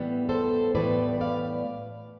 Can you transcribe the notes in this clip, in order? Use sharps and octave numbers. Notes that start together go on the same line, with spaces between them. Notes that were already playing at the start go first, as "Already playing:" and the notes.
Already playing: A2 E3 G3 B3
A4 C5
A2 E3 G3 B3 B4 D5
D5 F5